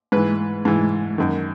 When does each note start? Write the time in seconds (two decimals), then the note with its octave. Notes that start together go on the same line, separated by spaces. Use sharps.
0.12 G#2 E3 B4
0.65 G#2 E3
1.18 F#2 D#3